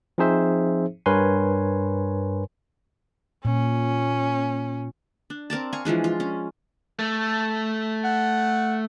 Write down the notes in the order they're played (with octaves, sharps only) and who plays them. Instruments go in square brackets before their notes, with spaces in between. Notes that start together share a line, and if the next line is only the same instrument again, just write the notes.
[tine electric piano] F3 C4 D#4 G#4 C5 E5
G2 A#4 B4 C#5 G#5 C6
[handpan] A#2 [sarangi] C#4
[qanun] D4
C4 A#4 D5 A5
F5 G#5 C#6
E3 F3 G#3 D4
F4
C#4
[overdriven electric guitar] A3 [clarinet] A5
[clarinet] F#5